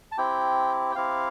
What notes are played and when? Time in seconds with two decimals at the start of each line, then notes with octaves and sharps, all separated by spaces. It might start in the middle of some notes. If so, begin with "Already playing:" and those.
0.12 A5
0.18 C4 E4 G4 G5
0.92 G5
0.95 C4 E4 G4 F5